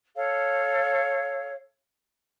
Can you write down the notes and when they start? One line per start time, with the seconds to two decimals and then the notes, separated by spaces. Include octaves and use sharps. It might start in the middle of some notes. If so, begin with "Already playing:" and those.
0.15 A4 C#5 F5